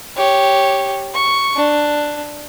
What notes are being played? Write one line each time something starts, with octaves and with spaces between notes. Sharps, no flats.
G4 C#5
C#6
D4